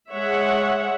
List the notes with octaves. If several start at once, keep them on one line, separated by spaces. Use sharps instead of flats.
G#3 C#5 E5 F#5